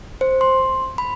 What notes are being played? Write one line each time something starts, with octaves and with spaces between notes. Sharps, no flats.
C5
C6
B5